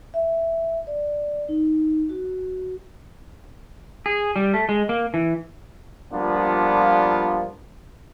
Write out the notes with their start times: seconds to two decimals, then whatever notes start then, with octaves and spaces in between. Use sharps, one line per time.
0.14 E5
0.87 D5
1.49 D#4
2.09 F#4
4.06 G#4
4.36 G3
4.54 A3
4.69 G#3
4.89 A#3
5.14 E3
6.12 F3 G3 A#3 B3 D4 F4